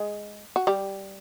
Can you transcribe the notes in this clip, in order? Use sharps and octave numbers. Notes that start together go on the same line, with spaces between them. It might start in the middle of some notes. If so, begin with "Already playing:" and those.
Already playing: G#3 G#4
F#4
G3 G4